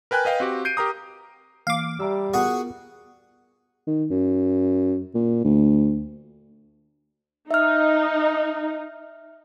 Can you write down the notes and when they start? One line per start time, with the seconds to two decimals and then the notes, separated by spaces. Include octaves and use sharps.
0.11 A#4 B4 G5 G#5 F#6
0.25 B4 D#5 F5 G5
0.40 C4 F#4 G4
0.65 G6 C7 D7 D#7
0.77 G4 A#4 A#5 D#6
1.67 E3 A#3 F5 D6
2.00 G3 E5 A#5 E6
2.33 B3 F4 F#4 G#4 A#4 F#5
3.87 D#3
4.10 F#2
5.14 A#2
5.44 D2
7.51 D#4 E5 F6